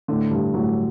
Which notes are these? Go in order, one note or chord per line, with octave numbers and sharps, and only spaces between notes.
A2 D3
G2
A2 F#3